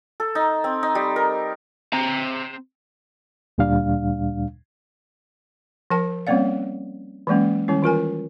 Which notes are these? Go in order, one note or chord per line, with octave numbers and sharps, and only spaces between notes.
A4
D#4
C4
D#4
G3
A#4
C4 A#5
D2 A#2 G3 D4 F5
F3 A#4 G5 A5
G3 A#3 C4 C#4 D5 F5
E3 F#3 G#3 A#3 C#4
D#3 G3 C#4 E4
E3 F4 A#4 G#5